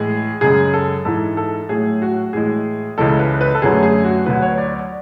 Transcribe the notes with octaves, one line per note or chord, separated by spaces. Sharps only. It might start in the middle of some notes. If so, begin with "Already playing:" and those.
Already playing: A2 E3 G#3 G#4
F#2 C#3 G#3 G#4
A4
G#2 E3 G#3 A4
A4
A2 F#3 A3 G#4
F#4
A2 E3 G#3 G#4
C#2 C#3 E3 G#3 A4
B4
B4
A4
F#2 D3 F#3 A3 G#4
G#4
F#4
D2 D3 F#3 B4
C#5
D5
D5